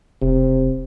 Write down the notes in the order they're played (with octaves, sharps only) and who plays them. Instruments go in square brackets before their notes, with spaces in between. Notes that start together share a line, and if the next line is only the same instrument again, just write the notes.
[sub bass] E1 [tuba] C3